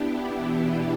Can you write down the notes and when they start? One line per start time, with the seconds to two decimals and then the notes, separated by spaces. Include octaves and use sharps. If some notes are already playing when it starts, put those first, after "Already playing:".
Already playing: B3 D4 E4 G4
0.35 B2 E3